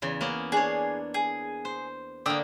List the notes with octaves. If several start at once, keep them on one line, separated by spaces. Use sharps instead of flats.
E2 C#3
A#3 B3 C#4
D4 G#4 C#5
G#4
C5
D3 A#3 G5 D#6 E6